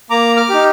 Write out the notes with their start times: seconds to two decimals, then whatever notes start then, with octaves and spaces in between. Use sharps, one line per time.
0.10 A#3 A#5 D6
0.36 D6 F6
0.49 D#4 G4